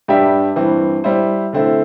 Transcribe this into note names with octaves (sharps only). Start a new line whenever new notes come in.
G2 G3 D4 G4 E5
G2 E3 C4
G3 E4 C5
D3 A3 C4 E4